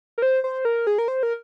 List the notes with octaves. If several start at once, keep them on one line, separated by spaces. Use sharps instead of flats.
A#4
C5
C5
A#4
G#4
A#4
C5
A#4